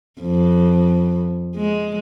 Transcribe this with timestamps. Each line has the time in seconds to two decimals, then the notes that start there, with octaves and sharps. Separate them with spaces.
0.21 F2
1.56 G#3